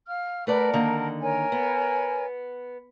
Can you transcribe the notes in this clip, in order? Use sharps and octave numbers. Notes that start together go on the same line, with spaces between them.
F5 F6
A3 A#4 B4 D5 F#5 A5
D3 D#3 A#3
A#4 C#5 G#5
B3